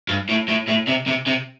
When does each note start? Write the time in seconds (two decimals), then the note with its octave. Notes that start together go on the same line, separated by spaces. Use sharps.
0.09 G2
0.29 A2
0.49 A2
0.68 A2
0.88 C3
1.07 C3
1.27 C3